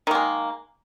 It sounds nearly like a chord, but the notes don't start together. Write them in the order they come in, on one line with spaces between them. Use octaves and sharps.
D#3 A#3 G#3